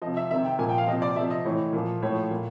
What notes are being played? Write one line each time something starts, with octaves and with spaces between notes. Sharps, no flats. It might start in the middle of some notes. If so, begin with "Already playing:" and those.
C3 F3 D#5
E5
C3 D#3 E5
G5
A#2 F3 G#5
G5
F5
C3 F3 D#5
D5
C3 F3 E5
D#5
A2 E3 C#5
A#2 F3
A2 F3 C#5
A#2